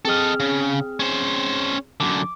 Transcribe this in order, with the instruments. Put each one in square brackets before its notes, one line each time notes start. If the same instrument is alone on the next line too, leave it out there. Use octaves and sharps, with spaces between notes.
[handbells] C4 G#4 F6 [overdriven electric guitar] A4 D#5
[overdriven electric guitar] C#3
C#4 C5
[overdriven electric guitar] F#2 D3 [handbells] D6